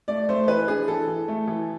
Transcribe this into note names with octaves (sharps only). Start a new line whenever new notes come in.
A3 D5
A3 C5
E3 B4
D4 G#4
E3 A4
E3
A3
E3